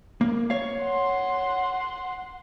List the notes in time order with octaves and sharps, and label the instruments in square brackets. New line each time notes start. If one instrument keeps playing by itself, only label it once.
[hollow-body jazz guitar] A#3
C#5 F5
[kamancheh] F#5 C6